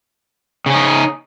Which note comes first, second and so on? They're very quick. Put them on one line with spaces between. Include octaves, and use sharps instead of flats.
C#3 C#4 D#4